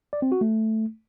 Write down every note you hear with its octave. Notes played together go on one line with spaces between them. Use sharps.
D5
C4
F#4
A3